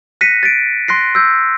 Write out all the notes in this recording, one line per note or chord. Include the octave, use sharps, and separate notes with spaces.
F#6 A#6 B6 C#7 D#7
A6 B6 D7
C6 F#6 A#6 C7
E6 G6